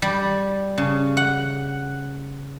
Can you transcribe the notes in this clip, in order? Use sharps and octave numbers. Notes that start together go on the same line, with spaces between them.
G3
C#3
F#5